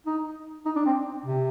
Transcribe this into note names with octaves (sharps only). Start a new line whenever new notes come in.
D#4
D#4
D4
C4
C3